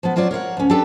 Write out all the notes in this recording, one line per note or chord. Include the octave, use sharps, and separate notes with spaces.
F3 B3
F#3 C4 F4 C#5 D5
A#4 C#5 F5 F#5
D2 C#4
D4 G4 A4 B4 G5